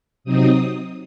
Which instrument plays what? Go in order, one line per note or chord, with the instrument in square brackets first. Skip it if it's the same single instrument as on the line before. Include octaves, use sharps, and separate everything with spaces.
[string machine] C3 F#3 C4 D#4 D#6